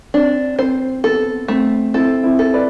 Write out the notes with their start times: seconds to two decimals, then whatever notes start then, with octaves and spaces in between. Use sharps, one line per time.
0.14 C4 D4
0.59 C4 C5
1.04 B3 A4
1.48 A3 C4
1.94 C4 E4 A4
2.23 C4 E4
2.39 A4
2.54 B4 D5